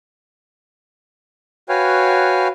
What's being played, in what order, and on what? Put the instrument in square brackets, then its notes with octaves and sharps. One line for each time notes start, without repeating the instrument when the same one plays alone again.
[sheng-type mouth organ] F#4 B4 C#5 F5 G5 G#5